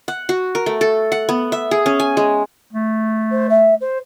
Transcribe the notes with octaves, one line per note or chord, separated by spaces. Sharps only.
F#5
F#4
A#4
A3
A4
F#5
B3
E5
G#4
C#4
G#5
G#3
A3
C5
E5
C5